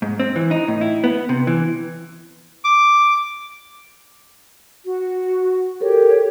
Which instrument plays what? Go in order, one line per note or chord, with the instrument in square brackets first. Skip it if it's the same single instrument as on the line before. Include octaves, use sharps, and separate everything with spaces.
[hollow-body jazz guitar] G#2
C4
E3
D#4
A2
E4
B3
C3
E3
[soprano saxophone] D6
[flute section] F#4
[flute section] G4 C#5 [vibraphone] A4 A#4